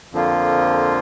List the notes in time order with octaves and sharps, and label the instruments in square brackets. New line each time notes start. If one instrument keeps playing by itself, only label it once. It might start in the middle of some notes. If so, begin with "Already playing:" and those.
[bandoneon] F2 D3 F3 A#3 F4